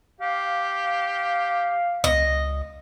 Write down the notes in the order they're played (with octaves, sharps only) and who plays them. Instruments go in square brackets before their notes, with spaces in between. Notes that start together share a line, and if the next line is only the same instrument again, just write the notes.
[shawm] G4 [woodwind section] F5
[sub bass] C#2 [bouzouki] D#5